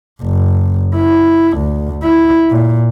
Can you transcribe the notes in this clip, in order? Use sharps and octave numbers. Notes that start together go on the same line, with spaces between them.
F#1
E4
D2
E4
A#2